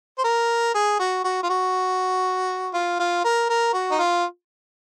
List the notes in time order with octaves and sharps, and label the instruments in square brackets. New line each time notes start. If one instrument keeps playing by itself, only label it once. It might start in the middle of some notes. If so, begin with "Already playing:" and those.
[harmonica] C5
A#4
G#4
F#4
F#4
F4
F#4
F4
F4
A#4
A#4
F#4
D#4
F4